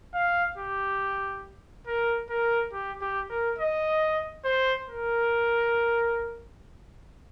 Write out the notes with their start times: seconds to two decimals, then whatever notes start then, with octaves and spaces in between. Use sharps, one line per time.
0.14 F5
0.58 G4
1.87 A#4
2.30 A#4
2.72 G4
3.01 G4
3.30 A#4
3.59 D#5
4.45 C5
4.88 A#4